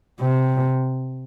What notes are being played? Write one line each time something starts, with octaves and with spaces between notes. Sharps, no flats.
C3